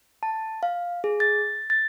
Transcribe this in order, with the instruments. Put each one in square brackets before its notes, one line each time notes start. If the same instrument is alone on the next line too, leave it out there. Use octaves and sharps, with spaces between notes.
[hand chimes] A5
F5
G#4
A6
A6